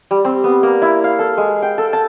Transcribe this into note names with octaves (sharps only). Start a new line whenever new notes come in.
G3
C4
B3
A#3
E4
F5
A4
G#3
G5
A4
A5